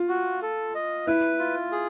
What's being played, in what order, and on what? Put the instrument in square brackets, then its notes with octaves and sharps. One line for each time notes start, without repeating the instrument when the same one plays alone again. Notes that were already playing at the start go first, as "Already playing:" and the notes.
Already playing: [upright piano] F4
[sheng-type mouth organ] F#4
A4
D#5
[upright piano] E4 [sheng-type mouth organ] B4
[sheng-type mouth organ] F4
G#4